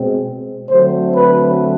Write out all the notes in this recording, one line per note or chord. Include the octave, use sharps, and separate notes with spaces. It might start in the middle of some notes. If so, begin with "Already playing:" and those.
Already playing: B2 G#3 C4
D3 F#3 A3 C4 C5
B4